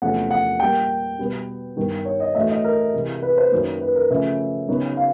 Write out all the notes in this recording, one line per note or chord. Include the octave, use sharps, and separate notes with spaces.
E2 C3 F3 A3 C#4 F#5
F#5
A#2 G3 A#3 G5
B2 G3 B3
G2 D#3 G3 B3
C#5
D#5
A2 E3 A3 D4 F#4 E5
D#5
A#4
C3 E3 G#3
B4
C5
F#2 D#3 F#3 A#3
B4
A#4
C#3 F3 A3 C#4 E5
C#3 F#3 B3 D#4 F#4
F5